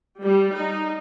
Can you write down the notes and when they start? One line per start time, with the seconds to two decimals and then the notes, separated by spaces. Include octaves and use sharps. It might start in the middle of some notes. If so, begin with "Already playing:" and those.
0.22 G3
0.58 D#4